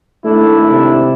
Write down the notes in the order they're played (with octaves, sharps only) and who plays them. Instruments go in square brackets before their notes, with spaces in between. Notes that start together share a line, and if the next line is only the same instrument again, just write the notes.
[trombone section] G#1 D4 E4 [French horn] A3
[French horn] C3